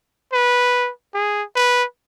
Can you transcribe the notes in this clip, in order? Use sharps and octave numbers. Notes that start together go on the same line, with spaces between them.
B4
G#4
B4